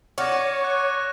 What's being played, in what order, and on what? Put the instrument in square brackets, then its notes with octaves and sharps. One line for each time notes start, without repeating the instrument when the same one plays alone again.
[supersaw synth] C#5 [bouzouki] D5 [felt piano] F#5 F6 [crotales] C#6 D6 A#6
[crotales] F#6